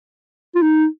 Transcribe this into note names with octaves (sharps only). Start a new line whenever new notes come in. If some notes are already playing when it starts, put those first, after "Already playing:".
F4
D#4